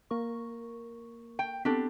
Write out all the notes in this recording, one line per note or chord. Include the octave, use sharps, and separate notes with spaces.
A#3 A#4 C#6
G5
B3 C4 D4 G4 A4